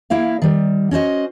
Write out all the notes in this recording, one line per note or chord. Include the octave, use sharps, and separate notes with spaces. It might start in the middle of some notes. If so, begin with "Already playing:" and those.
A#3 E4 E5 F5
D#3 G3
C#4 F#4 C5 D#5